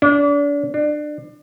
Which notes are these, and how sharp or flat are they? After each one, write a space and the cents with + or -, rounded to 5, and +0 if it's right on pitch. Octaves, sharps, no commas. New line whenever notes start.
D4 -35
D4 +25